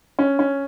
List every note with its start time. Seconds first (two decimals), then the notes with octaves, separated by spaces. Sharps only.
0.19 C#4
0.39 C#4